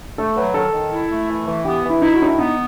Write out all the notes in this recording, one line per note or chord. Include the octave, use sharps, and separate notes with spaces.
A3 A4
F#3 B4
D#3 A4
D#3
E4
A3
E3
E3
B3 G4
E3
E4
D#4 E4
F#4
A2 D#4
E4
B3 D#4